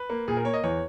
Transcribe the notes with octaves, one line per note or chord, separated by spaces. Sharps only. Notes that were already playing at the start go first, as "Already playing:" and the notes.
Already playing: B4
A#3
A#2 G#4
A#4
A#3 C#5
D#5
E2 C#5